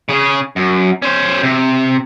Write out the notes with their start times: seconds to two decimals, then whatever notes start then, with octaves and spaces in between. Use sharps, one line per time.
0.09 C#3 G#4
0.56 F#2
1.02 C#4 C5
1.43 C3